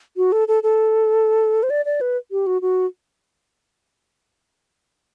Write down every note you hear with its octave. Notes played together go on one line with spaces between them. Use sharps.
F#4
A4
A4
A4
C5
D5
D5
B4
G4
F#4
F#4